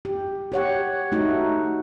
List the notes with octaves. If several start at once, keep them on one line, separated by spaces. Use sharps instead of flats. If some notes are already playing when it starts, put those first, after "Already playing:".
G4
G4 C#5 F#5
A3 D#4 F#4